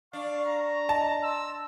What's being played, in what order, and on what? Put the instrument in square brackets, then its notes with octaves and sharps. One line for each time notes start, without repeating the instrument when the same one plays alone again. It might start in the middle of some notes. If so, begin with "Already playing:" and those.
[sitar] D4 [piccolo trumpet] F5 [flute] C#6
[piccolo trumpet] A#5
[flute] D#5 [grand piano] A5
[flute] C6 [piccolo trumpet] E6